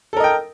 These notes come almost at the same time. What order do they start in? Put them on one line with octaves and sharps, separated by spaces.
A4 A#4 D#5 G5